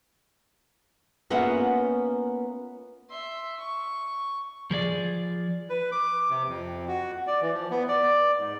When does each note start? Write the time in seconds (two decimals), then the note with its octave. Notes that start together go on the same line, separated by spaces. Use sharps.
1.30 A#3 B3 C#4 F4 E5 F#5
3.10 E5 C6
3.59 C#6
4.71 F3 G#4 D5
5.70 B4
5.92 D6
6.30 C3
6.49 F2
6.88 F#4
7.27 D5
7.41 E3
7.53 F3
7.71 B3
7.88 D5
8.39 G#2